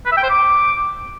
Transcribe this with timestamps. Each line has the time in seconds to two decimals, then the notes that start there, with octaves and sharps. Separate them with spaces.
0.05 B4
0.11 E5
0.17 G5
0.23 C5
0.29 D6